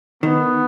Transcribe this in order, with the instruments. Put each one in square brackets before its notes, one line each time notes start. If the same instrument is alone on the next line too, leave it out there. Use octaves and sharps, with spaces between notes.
[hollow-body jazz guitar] D#3 [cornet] B3